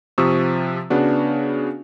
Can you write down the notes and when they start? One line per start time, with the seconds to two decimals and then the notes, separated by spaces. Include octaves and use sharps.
0.18 C3 F3 C#6 D#6 E6
0.90 C#3 B3 D4 F#4